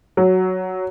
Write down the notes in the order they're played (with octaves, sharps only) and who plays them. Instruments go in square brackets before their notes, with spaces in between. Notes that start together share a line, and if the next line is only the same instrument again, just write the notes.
[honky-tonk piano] F#3